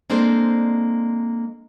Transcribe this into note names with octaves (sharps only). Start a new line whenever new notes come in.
G#3 A#3 C4 D4 A4 C5